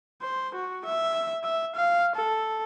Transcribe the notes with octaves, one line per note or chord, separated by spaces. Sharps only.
C5
F#4
E5
E5
F5
A4